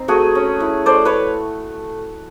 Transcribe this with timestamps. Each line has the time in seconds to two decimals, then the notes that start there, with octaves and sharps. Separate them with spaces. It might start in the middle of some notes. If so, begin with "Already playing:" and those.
Already playing: C4 D#4
0.08 A3 F#4 G#4
0.35 C#4
0.60 E4
0.86 A3 C5 D5
1.05 B4 C#5